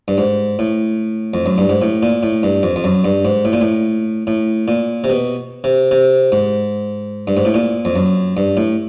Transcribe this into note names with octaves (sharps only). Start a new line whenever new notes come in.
G2
G#2
A2
F2
F#2
G2
G#2
A2
A#2
A2
G2
F2
F2
F#2
G2
G#2
A2
A#2
A2
A2
A#2
C3
B2
C3
C3
G#2
G2
G#2
A2
A#2
F2
F#2
G2
A2